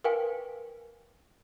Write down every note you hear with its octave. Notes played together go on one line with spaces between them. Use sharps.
A#4 B4 F5 G5 G#5